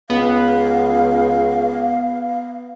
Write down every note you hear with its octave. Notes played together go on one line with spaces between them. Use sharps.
C#2 B3 F5